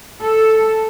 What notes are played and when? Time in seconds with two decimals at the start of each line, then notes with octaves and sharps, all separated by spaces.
0.21 A4